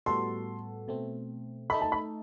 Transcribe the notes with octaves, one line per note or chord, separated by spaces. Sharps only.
A2 G3 B3 F#4 A4 C6
B2 A3 C4
A3 D#4 A4 B5
A5
B5